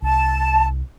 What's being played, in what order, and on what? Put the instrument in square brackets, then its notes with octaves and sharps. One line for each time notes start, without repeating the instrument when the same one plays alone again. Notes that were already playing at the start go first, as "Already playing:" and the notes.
[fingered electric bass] C2 [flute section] A5